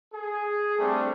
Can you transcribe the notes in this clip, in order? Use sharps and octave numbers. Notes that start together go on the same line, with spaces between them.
G#4
G3 A3 C4 D4 A4